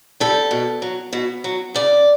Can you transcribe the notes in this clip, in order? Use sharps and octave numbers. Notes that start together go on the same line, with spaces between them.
G3 A4
B2
F#3
B2
F#3
C#3 D5